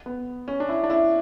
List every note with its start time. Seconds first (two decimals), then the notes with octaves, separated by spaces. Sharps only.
0.06 B3
0.48 C#4
0.60 D4
0.69 E4
0.84 D4
0.90 E4